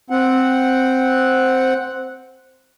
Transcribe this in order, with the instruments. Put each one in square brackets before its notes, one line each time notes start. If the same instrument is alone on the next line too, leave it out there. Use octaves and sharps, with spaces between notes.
[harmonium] C4 F#5